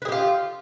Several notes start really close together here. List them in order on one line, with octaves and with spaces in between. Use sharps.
B4 G#4 G4 F4